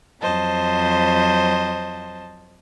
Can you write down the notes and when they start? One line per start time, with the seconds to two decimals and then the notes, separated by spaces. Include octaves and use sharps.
0.22 F2 F#3 C5 D#5 A5